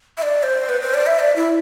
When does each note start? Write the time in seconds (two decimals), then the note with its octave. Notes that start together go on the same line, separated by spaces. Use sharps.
0.18 E5
0.22 D5
0.43 C5
0.69 B4
0.81 C5
0.94 D5
1.06 E5
1.19 D5
1.36 E4